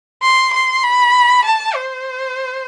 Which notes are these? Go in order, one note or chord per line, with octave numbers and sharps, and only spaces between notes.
C6
C6
B5
A5
C5